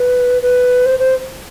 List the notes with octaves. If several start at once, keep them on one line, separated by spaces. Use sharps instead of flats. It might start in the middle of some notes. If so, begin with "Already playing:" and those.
Already playing: B4
B4
C5
C5